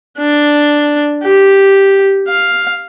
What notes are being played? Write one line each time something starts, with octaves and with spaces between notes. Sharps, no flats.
D4
G4
F5